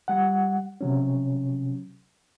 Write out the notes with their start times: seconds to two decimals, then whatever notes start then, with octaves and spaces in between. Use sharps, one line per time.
0.08 G3 F#5
0.81 C3 F#3 C#4